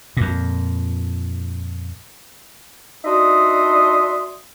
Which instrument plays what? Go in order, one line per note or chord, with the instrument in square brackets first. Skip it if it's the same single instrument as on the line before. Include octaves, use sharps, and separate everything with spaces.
[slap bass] F2 A#2
[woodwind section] D4 D#4 F#4 E5 C6 D#6